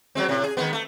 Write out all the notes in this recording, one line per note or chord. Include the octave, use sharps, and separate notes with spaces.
F#3 G#3 C4
A2 C3
G#4
D#3 G#3 B3
A3